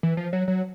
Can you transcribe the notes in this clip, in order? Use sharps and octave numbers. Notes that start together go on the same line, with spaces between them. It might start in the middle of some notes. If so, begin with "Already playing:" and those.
E3
F3
F#3
F#3